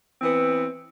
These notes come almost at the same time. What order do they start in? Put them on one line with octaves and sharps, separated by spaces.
C4 E3 B3